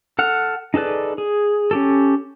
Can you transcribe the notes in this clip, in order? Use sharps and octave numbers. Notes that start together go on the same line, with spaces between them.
A4 F#5 F6
D#4 G#4 A4 B4 D5
G#4
C#4 G4 A4